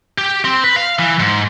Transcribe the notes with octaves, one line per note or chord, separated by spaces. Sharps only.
G4
C4
B4
F5
E3
G#2